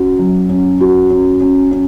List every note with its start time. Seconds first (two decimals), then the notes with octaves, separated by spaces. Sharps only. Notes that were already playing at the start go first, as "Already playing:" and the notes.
Already playing: C#4 F#4
0.19 F#3
0.49 C#4
0.80 F#4
1.10 C#4
1.41 C#4
1.71 C#4